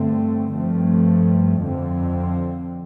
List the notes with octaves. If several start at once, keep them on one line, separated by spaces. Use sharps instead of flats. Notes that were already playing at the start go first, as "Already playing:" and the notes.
Already playing: G2 D3 A3 C4
G2 F3 A3 C4
F2 D3 F3 C4